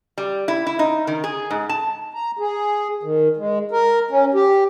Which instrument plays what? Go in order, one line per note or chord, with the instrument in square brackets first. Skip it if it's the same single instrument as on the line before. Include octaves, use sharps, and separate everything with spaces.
[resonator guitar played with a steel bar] G3
E4
E4
D#4
D#3
G#4
G#2
A5
[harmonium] A#5
G#4
D#3
G#3
A#4
C#4
G4